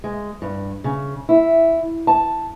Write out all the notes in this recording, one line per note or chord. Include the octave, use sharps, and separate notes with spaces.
G#3
G2
C#3
E4
A5